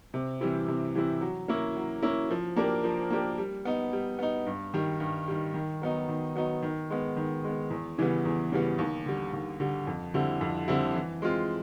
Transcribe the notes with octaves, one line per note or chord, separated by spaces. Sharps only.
C3
E3 G3 C4 E4
C3
E3 G3 C4 E4
F#3
A#3 C#4 E4
F#3
A#3 C#4 E4
F3
A#3 D4 G4 A#4
F3
A#3 D4 G4 A#4
G3
B3 D#4
G3
B3 D#4
G2
D#3 G3
G2
D#3 G3
D#3
F#3 B3 D#4
D#3
F#3 B3 D#4
D#3
G#3 B3
D#3
G#3 B3
E2
C#3 E3 G3 B3
E2
C#3 E3 G3 B3
D#2
D3 G3
D#2
D3 G3
F2
D3 G3 C4 E4
F2
D3 G3 C4 E4
E3
G#3 C4 F4